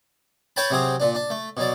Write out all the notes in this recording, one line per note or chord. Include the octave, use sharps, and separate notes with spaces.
B4 C#5 G5 A5 B5
C3 F#3 C4 G#4
A#2 D4
D4
A3
B2 F#3 D5